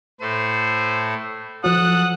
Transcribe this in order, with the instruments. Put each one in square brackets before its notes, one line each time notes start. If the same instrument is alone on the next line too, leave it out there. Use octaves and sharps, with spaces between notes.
[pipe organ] A2 A3 [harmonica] C5
[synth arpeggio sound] F3 F#3 [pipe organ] A4 F#6 [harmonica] F#5 D#6